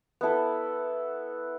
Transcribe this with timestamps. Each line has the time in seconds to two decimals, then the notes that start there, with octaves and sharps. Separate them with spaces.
0.21 B3 E4 A4